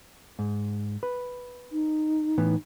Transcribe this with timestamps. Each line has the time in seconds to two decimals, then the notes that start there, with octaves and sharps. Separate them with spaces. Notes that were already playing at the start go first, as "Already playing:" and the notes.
0.39 G#2
1.03 B4
1.72 D#4
2.38 A2 E3 B3